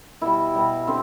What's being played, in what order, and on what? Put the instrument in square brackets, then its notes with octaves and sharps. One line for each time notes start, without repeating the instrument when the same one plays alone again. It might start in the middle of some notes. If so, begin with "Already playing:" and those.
[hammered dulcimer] B2 G3 E4
B2 G3
D3 C4